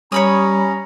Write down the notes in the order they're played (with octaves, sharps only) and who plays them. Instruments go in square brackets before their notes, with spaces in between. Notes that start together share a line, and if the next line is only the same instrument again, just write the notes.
[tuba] G3 [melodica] C#4 [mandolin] C#5 B5 D#6 [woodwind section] A#5